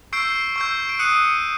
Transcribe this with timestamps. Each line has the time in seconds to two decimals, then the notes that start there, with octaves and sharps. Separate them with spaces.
0.13 C#6 E6 G6 C7 D7
0.56 C#6 E6 G6
0.89 D7
0.99 D#6 F#6 C#7 D#7